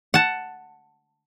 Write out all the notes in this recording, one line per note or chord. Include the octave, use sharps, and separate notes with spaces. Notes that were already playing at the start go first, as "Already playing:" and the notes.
F#5 A5